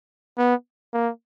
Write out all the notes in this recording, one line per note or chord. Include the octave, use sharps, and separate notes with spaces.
B3
A#3